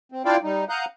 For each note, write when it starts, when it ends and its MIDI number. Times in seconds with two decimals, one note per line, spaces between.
0.12 0.22 60
0.25 0.37 62
0.25 0.37 64
0.25 0.37 65
0.25 0.37 74
0.25 0.37 77
0.25 0.37 79
0.43 0.65 55
0.43 0.65 63
0.69 0.85 77
0.69 0.85 78
0.69 0.85 82
0.69 0.85 87
0.69 0.85 90
0.69 0.85 91